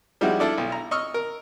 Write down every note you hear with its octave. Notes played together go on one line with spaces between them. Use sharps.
F3 G3 G#3 D#4 E4 F#4
D4 E4 F4 A4 D5
B1
A#5
D#5 C#6 E6 F6
A#4